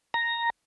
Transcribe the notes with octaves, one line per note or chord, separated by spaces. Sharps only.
A#5